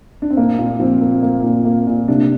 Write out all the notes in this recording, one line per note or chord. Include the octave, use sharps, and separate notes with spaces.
D4
C4
A#2 A#3
A#2
F3 C4
A#3
A#3
A#2
A#3
A#2
C3 D4